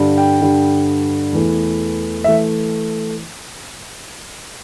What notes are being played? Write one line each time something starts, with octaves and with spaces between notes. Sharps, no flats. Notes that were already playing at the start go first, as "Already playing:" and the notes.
Already playing: G2 D3 G3
G5
G2 D3 G3
E2 E3 A3
E3 A3 E5